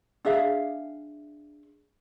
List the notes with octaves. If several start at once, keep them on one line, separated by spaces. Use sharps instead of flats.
D4 G#4 E5 F5